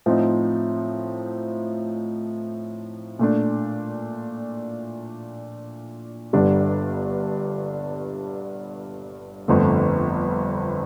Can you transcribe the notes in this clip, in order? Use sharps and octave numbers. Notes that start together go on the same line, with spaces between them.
A2 F3 C4 D#4
A#2 A3 D4
G1 G2 D3 G3 D4
G1 F2 D3 A3